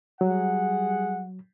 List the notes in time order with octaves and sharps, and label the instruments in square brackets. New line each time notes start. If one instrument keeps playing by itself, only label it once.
[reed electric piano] F#3 [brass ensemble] G3 G#4 F#5